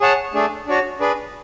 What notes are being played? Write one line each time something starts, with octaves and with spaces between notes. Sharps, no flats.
G#4 C#5 F#5 A5
A3 D4 G#4
D4 F#4 C#5
D4 G#4 B4